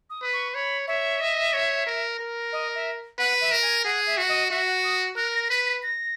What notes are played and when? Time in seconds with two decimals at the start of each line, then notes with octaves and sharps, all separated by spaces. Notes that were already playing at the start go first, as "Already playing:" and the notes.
0.10 D#6
0.22 B4
0.33 C#6
0.54 C#5 B5
0.87 C#5 E5
1.21 D#5
1.53 C#5
1.86 A#4
2.19 A#4
2.52 D#5
2.75 E5
3.18 B4 F#5
3.41 E5
3.51 A#4
3.62 G#5
3.85 G#4 F#5
4.07 E5
4.17 F#4
4.29 D#5
4.50 F#4 E5
4.66 F#5
4.84 D#6
5.16 A#4 F#6
5.33 A#6
5.49 B4 B6
5.66 B6
5.83 A#6